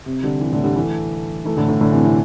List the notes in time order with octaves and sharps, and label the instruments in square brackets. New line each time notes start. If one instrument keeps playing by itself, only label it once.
[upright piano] C3
D3 G3
C3 E3
A2 D3
D3 G3
E3 A3
E3 A3
A2 D3
A2 D3
A2 D3
C3 E3
C3 E3